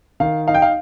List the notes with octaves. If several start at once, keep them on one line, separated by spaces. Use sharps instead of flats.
D#3 F5
D#4 F5
G5
F5